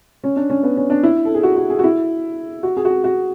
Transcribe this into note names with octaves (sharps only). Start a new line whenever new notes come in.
C#4
D4
C#4
B3
C#4
D4
E4
A4
G#4
F#4
F#4
G#4
F#4
E4
F#4
G#4
F#4
G#4
F#4